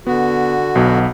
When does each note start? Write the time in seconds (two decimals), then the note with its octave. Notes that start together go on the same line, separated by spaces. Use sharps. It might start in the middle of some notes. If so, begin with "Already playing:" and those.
0.07 D3 B3 F#4
0.75 B1 B2 F#5